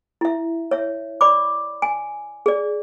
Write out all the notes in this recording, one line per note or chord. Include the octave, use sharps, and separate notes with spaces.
E4 E5
C#5 E5
D5 B5 D6
G#5
G#4 D5